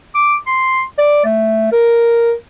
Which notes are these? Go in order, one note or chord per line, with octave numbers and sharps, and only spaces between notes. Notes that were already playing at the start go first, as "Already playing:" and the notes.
D6
C6
D5
A3
A#4